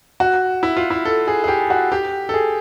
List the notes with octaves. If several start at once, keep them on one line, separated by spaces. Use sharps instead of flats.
F#4
E4
F4
E4
A4
G#4
G#4
G4
F#4
G4
A4
G#4